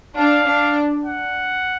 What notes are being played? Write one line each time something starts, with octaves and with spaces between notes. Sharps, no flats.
D4 F5
D4
F#5